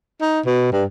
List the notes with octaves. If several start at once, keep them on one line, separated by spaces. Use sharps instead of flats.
D#4
B2
G2